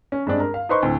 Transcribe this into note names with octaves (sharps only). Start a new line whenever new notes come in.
C#4
G2 G#3 C4 D4
A#4
F5
D#4 B4 C5 C6 C#6
D2 A2 C4